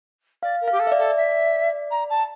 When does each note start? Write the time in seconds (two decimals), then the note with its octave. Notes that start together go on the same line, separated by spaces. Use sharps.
0.43 D5 F5
0.61 A#4
0.68 G4 F5
0.80 A4
0.87 E5
0.92 D5
0.98 A4
1.17 E5
1.91 A#5
2.10 A5